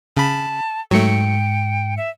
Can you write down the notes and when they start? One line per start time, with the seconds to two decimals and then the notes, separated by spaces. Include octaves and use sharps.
0.17 C#3 A5 B5
0.91 G#2 F#3 A3 G5 C#7
1.97 E5